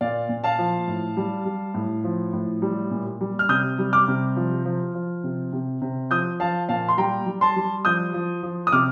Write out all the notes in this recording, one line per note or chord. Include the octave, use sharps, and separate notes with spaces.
A#2 D5 F5
A#2
F5 A5
F3
A2
G3
G3
A2
F3
A2
G3
A#2
G3
F6
C3 D#6 G6
G3
D6 F6
C3
F3
F3
F3
C3
C3
C3
F3 D#6 G6
F3 F5 A5
A#2 F5 A5
C6
G3 G5 A#5
G3
A5 C6
G3
F3 D#6 G6
F3
F3
D#6
C3 D6 F6